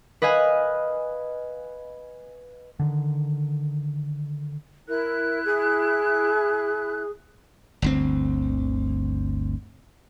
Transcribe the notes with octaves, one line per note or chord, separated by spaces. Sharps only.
B4 D#5 F5 G#5 F#6
D3 D#3
E4 A#4 F#6
G#4
G1 D2 C4